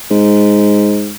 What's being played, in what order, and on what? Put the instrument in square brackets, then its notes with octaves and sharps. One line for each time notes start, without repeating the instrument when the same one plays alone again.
[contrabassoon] G#2